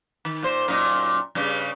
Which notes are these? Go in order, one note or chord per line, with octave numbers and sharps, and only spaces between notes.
D#3
A#2 C5
F#2 A#2 D#4
G2 C#3 G3